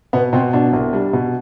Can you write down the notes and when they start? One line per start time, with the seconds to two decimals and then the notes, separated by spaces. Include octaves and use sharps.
0.13 B2 B3
0.33 B2 C4
0.53 B2 D4
0.73 C2
0.93 G3 D4
1.13 B2